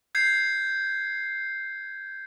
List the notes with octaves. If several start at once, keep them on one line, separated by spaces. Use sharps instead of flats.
G6 G#6 C7